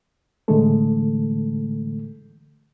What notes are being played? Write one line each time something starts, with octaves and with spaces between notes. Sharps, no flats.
A2 D3 E3 G#3 A3 A4